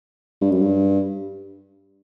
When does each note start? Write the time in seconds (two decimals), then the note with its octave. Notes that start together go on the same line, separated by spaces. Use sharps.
0.42 G2
0.52 F#2
0.62 G2